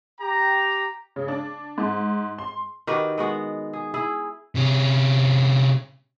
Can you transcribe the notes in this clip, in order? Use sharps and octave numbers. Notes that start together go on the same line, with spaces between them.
G4 G5 A#5
C#3
D4
G#2
C6
D#3 F#4 G4 B4
G#3 B3 F#4
G#4
E4 G#4
C3 C#4